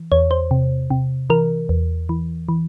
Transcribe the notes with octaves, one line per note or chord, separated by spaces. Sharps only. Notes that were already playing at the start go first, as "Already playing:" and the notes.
Already playing: E3
E2 C#5
C5
C3
C3
E3 A#4
E2
E3
E3